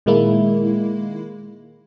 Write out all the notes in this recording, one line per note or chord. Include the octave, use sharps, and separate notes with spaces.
A#2 D#3 G#3 A#3 E4